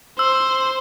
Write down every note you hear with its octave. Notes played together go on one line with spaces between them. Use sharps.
C5 E6